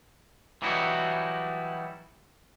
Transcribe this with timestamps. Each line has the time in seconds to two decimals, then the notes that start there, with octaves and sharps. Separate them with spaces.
0.62 E3 F#3 G3 D#4 E4 F#4